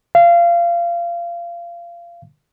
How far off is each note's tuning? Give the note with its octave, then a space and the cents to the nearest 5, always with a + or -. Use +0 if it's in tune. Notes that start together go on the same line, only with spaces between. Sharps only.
F5 -25